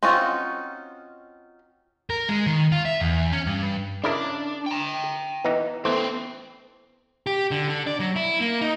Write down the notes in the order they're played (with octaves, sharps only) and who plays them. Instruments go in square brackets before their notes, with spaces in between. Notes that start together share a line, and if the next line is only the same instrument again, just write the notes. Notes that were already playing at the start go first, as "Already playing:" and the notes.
[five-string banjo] C4 C#4 D#4 F4 F#4
[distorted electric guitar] A#4
G#3
D#3
F4
E5
E2
C#4
G2
[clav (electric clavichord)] C#3 E4 A#4 [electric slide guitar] D4
[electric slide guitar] G5 A#5
[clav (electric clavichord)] E3 B3 D#4
[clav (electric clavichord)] E3 A3 C5 [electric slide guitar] B3 C4
[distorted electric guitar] G4
D3
D3
D5
F#3
E4
A#3
D#4